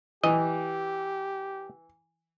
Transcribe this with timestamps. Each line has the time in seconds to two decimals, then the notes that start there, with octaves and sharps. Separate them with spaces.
0.24 E3 G4 D#5